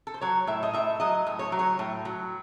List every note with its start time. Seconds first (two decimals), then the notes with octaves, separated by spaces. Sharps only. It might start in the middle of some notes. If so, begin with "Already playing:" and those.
0.07 A4
0.14 C5
0.21 F#3 C#5
0.47 A2 E5
0.63 D#5
0.73 A2 E5
1.00 F#3 D#5
1.27 A2
1.39 C#5
1.52 F#3
1.59 C#5
1.79 A2
2.05 F#3